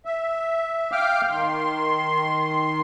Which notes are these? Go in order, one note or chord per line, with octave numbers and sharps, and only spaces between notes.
E5
F5 G5 D6 F6
D#3 C6